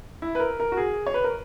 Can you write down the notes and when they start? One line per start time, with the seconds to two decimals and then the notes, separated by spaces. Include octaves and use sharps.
0.22 E4
0.35 B4
0.40 A#4
0.60 A#4
0.72 F#4
0.77 G#4
1.07 C#5
1.14 B4
1.24 A#4